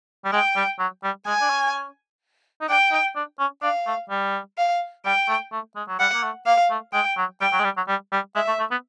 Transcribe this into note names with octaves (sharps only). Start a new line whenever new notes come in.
G3
G#3 G5
G3
F#3
G3
G#3 G#5
D4
C#4
D#4
D4 G5
D#4
D4
C#4
D4 F5
A3
G3
F5
G3 G5
A3
A3
G#3
F#3
G3 F#5
A#3
A3
A#3 F5
A3
G#3 G5
F#3
G3 G5
F#3
G#3
G3
F#3
G3
G3
G#3 E5
A3
A3
B3